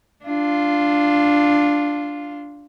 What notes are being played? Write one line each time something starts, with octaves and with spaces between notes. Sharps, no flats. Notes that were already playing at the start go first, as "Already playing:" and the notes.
D4 F4